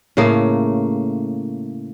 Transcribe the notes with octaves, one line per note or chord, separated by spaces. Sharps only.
A2 C#3 A3 A#3